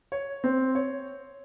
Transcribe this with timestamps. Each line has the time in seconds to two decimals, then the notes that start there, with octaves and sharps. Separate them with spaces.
0.12 C#5
0.44 C4
0.75 C#5